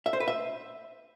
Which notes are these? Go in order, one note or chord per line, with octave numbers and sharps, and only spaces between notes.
E5
C5
B4
E5